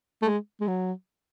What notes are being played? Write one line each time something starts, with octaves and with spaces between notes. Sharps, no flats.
A3
G#3
G#3
F#3